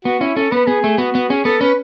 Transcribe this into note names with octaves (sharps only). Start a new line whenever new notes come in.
B3 F#4
C#4 E4
C#4 A4
B3 B4
B3 G#4
A3
B3 F#4
B3
C#4 G#4
B3 A4
C#4 B4